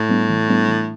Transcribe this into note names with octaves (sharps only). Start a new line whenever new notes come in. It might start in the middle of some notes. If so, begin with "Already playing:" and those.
Already playing: A2
G3 B3 D4
E3
G3 B3 D4
E3